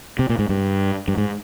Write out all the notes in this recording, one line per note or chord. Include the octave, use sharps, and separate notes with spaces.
C3
A#2
G#2
G2
G2
G#2